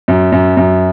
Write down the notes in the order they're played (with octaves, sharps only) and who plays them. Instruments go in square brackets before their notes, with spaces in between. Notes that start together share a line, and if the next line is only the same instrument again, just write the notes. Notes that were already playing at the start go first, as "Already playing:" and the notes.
[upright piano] F#2
F#2
F#2